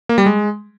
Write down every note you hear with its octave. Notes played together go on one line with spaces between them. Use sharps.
A#3
G3
G#3